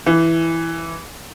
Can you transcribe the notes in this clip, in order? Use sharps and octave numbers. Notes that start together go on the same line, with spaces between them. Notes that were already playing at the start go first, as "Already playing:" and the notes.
E3